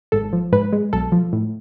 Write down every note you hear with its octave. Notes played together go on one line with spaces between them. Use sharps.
G#1 A4
F3
G#2 B4
G#3
B1 A4
F3
A2